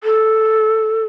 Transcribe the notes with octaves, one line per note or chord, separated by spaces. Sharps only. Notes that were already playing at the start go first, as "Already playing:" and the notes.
A4